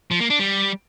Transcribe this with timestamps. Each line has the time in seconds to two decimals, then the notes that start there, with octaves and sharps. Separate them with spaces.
0.11 F3
0.20 A#3
0.30 D4
0.40 G3